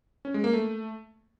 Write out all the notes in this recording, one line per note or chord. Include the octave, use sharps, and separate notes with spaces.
C#4
G#3
A#3
A3